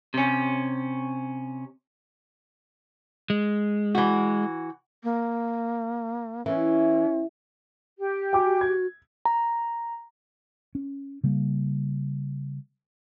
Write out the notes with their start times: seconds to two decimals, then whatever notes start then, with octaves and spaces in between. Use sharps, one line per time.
0.14 C3 C#4
3.30 G#3
3.95 E3 F#4
5.04 A#3
6.46 E3 C#4
7.98 G4
8.33 F#4 G5 G#5 D6
8.61 G#6
9.25 A#5
10.75 C#4
11.24 C#3 G3 A#3